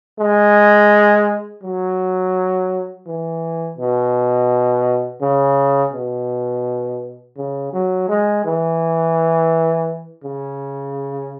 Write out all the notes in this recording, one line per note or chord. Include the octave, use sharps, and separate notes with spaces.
G#3
F#3
E3
B2
C#3
B2
C#3
F#3
G#3
E3
C#3